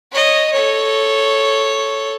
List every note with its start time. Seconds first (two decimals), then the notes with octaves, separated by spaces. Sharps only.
0.12 C#5 D#5
0.52 A4 C#5